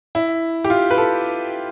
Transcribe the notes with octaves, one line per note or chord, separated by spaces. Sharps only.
E4
G4
F4
B4
A4